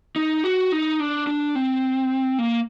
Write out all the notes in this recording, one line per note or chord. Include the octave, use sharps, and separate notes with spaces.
D#4
F#4
D#4
D4
D4
C4
A#3